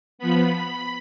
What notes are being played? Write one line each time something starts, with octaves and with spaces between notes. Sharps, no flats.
F3 B3 B5